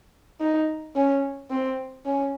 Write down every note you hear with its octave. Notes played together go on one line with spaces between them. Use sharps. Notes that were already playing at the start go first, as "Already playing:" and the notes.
D#4
C#4
C4
C#4